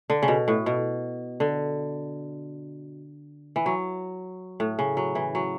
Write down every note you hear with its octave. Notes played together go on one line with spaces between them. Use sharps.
D3
C#3
B2
A2
B2
D3
E3
F#3
A2
C#3
F#3
E3
F#3